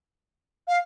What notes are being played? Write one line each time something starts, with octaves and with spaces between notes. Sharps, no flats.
F5